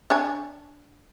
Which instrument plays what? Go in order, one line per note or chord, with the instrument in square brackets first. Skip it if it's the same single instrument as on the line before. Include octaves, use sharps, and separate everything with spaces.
[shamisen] D4 C#5 G#5